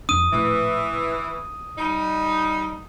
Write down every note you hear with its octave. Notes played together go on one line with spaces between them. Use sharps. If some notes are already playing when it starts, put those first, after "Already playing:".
F2 D4 D#6 D#7
A#1 A2 E3
G3 D#4